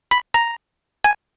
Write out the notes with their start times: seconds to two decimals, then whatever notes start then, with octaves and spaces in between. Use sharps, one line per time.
0.11 B5
0.34 A#5
1.04 G#5